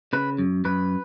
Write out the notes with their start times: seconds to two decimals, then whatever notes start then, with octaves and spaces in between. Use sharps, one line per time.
0.13 C#3 B4
0.38 F#2
0.65 F#2 B4